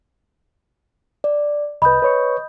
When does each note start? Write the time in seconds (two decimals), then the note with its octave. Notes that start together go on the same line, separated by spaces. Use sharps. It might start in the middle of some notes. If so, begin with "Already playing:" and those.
1.24 D5
1.82 C2 B4 D#5 B5 D#6 G6
2.02 B4 C#5 C#6